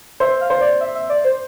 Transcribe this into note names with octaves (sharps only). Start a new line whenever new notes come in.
C5 E5
F5
C5
D5
E5
E5
D5
C5